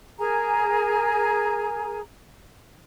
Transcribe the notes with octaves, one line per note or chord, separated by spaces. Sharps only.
G#4 A#4 G#5 A#5